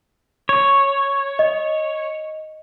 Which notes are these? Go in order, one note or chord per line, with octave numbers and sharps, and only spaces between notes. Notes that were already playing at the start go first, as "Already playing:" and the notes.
C#5
D#5